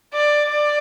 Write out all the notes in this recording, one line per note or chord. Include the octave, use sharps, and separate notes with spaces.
D5
D5